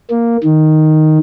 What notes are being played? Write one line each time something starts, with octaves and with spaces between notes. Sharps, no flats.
A#3
D#3